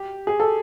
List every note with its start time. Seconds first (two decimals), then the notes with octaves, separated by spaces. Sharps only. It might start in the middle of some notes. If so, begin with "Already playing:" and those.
Already playing: G4
0.27 G#4
0.40 A4